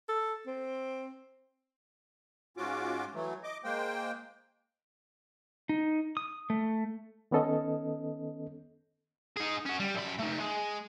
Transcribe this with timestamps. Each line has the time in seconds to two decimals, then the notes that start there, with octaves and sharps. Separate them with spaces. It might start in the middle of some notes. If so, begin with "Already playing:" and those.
0.09 A4
0.47 C4
2.57 G#2 C#4 F4 F#4 D6
3.15 E3 F#3 A3
3.43 D#5 D6
3.64 G#3 A#3 C5 G5
5.69 D#4
6.17 D#6
6.50 A3
7.31 D#3 B3 C#4 A4 D#5
9.36 D#4 G#4
9.66 C#4 F#4
9.79 G3
9.95 F#2 B5
10.19 A3 D#4
10.40 G#3